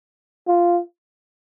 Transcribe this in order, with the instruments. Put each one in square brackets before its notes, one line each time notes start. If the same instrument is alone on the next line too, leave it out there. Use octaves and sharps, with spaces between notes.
[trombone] F4